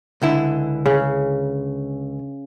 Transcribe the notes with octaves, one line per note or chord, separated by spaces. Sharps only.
C#2 D3 E4
C#3